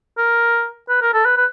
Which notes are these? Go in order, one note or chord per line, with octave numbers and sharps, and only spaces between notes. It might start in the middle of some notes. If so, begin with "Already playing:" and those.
A#4
B4
A#4
A4
B4
B4